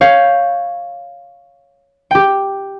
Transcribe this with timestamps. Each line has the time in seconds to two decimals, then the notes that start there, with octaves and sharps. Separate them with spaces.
0.01 C#5 F5 G6
2.11 G4 G5